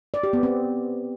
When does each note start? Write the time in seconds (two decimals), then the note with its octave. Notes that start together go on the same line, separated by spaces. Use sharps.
0.14 D5
0.23 G4
0.33 B3
0.43 C4